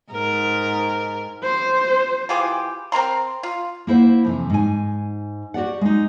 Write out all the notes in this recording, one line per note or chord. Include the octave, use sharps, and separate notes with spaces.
G#2 A#4
C5
E3 F4 G4 G#4
C4 A#4 A#5 C6
F4
A#3 E4 C5 F#5
F2 C3 E3
G#2 G#5
F#4 G4 D5 F#5
G#3 D#4